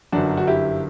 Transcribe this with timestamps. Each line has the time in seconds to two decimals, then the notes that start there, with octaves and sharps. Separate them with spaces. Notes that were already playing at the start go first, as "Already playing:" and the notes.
0.12 G1 F#2 F#3 D4 F#4
0.37 F#4
0.47 E4 G4